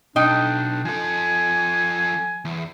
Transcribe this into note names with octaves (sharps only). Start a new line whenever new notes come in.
B1 D4 D#4 G5
F3 A4 G#5
E2